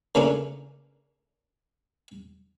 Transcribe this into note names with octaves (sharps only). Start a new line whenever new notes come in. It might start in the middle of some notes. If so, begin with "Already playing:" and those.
C#3 E3 A3 A#3 C#4 D4